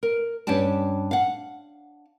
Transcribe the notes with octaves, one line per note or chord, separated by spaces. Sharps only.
A#4
G2 C#4 D4 G4 A5
F5 F#5